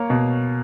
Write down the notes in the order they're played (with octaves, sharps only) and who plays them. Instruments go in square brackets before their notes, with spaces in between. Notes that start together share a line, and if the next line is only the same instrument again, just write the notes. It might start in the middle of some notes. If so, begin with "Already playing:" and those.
Already playing: [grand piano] A#3 C#5
B2